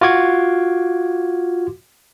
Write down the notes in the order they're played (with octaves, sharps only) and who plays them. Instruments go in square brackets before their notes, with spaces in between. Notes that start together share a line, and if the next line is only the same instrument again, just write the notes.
[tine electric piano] F4 F#4 D6 G#6